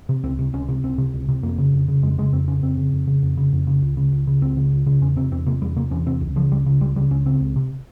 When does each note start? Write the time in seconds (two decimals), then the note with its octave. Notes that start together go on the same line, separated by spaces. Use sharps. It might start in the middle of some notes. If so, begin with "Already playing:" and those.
0.09 C3
0.23 C#2 C4
0.39 C3
0.53 C#2 C#4
0.68 C3
0.83 C#2 C4
0.98 C3
1.13 C#2
1.28 C3
1.43 F2 A#3
1.58 C#3
1.73 F2
1.88 C#3
2.03 F2 G#3
2.18 C#3 G#3
2.32 F2 C4
2.48 C#3 C#4
2.62 F2 C4
2.78 C#3
2.93 F2
3.07 C#3
3.23 F2
3.37 C#3
3.53 F2
3.67 C#3
3.82 C#2
3.97 C#3
4.12 C#2
4.27 C#3
4.42 C#2 C4
4.57 C#3
4.72 C#2
4.86 C#3
5.01 E2 C#4
5.16 C3 C4
5.31 E2 C4
5.46 C3 A#3
5.62 E2 G3
5.76 C3 A#3
5.91 E2 C#4
6.06 C3 C4
6.21 C#2
6.36 C#3 F3
6.51 C#2 G3
6.66 C#3
6.81 C#2 G3
6.96 C#3 G3
7.11 C#2 C#4
7.26 C#3 C4
7.41 C#2
7.56 C3